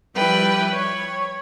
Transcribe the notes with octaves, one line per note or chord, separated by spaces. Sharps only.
F3 G3 E4 B4 G5
C#5